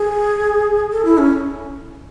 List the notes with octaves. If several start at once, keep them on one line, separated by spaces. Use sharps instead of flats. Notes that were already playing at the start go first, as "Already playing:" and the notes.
Already playing: G#4
A4
E4
C#4